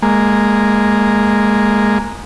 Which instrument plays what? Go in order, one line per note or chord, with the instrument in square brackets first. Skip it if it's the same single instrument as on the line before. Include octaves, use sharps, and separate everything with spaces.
[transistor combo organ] G#3 A#3